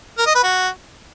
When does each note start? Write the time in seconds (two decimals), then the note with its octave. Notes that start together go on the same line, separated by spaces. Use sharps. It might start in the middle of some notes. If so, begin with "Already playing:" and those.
0.18 A#4
0.27 D#5
0.35 B4
0.44 F#4